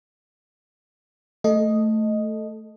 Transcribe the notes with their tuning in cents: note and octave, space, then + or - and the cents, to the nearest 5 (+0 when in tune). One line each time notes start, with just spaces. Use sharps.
A3 +0 A4 +0 D#5 +0